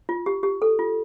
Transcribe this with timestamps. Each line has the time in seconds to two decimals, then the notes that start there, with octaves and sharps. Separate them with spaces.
0.09 F4
0.26 G4
0.43 G4
0.62 A4
0.79 F4